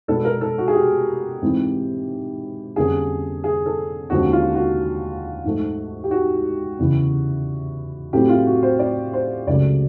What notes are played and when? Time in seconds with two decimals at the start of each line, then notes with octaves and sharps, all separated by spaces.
0.08 B2 G#3 B3 D4 A4
0.25 A#4
0.41 A4
0.58 F#4
0.68 G#4
0.75 G4
1.42 G#2 E3 G#3 C4
2.76 F2 D3 G3 A#3 C#4 G#4
3.44 G#4
3.66 A4
4.10 D#2 D3 F3 G#3 C#4 F#4
4.33 F4
4.55 F#4
5.45 G#2 F3 A3
6.04 G4
6.11 F#4
6.79 E2 C#3 E3
8.13 A2 F#3 A3 C4 E4 G4
8.29 F4
8.47 F#4
8.63 C5
8.79 D5
9.13 C5
9.47 C#2 C#3 F#3 A3 D5